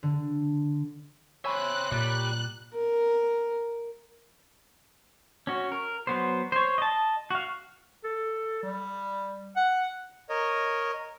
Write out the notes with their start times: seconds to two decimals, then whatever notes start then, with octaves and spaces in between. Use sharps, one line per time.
0.03 D3
1.45 C5 C#5 E5 G#5 B5 F#6
1.92 A#2 G3
2.74 A#4
5.47 C#4 F#4
5.72 A#4
6.07 F#3 B3 C5
6.52 C5 C#5
6.78 D#5 A5
7.30 F#4 F5
8.04 A4
8.63 G3
9.57 F#5
10.29 A#4 C#5 D#5